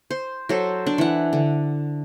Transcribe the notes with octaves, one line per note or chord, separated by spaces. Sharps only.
C5
F#3 A4 C5
D4
E3 F#5
D3